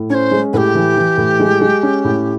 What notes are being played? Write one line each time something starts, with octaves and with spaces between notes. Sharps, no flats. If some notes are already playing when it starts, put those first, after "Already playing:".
Already playing: A2
C#4 C5 C#5
G#3
A2 G4 B4
E3
E3
A2
G#3
G#3
C#4
A2